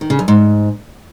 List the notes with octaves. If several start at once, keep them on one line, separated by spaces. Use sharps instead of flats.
D#3
C#3
F#2
G#2